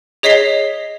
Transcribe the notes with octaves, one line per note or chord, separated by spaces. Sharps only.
G#4 C#5 D#5 B6 C7 G7